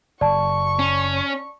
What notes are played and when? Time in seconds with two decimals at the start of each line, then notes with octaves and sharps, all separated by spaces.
0.21 F#1 D5 A5 C#6
0.79 C#4